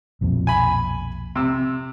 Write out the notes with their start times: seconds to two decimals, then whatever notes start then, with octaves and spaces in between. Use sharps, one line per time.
0.21 B1 F2 A#2
0.47 G#5 B5
1.36 C3 E6